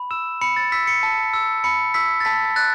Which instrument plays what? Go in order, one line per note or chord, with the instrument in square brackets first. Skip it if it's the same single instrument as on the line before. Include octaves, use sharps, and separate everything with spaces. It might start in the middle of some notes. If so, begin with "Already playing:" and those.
Already playing: [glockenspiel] B5
E6 E7
B5 C#7
A6
E6 B6
C#7
A5
E6
B5 C#7
E6 B6
A6
A5 B6
F#6 A6